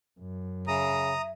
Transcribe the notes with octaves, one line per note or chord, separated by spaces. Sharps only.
F#2
C#3 E5 A#5 D#6